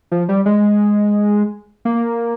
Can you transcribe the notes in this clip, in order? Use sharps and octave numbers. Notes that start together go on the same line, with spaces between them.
F3
G3
G#3
A#3